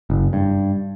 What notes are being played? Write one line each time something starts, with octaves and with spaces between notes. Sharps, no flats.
F#1
G2